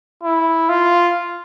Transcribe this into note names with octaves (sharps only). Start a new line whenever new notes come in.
E4
F4